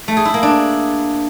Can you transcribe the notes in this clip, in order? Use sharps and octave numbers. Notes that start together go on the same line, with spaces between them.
A3
G#4
E4
A#3
D4